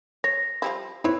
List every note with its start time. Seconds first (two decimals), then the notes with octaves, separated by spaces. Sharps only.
0.24 C#5 A#6
0.62 F3 G3 E4
1.04 C4 E4 B4 C#5